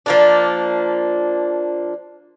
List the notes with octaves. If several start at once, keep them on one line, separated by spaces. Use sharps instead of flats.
F3 A#3 D4